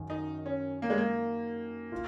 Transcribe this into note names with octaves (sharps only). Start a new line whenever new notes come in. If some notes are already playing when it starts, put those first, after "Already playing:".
Already playing: F#2 D#3
D#4
C#4
A#3
G#3
A#3
F4